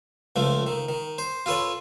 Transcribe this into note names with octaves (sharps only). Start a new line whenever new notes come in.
C#2 F3 A3
D#3
D#3
C5
F4 A4 B4 C#5